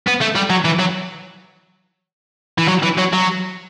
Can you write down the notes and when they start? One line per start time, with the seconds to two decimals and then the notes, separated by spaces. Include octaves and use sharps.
0.07 B3
0.21 A3
0.35 G3
0.50 F#3
0.65 E3
0.80 F#3
2.58 E3
2.68 F#3
2.83 E3
2.98 F#3
3.13 F#3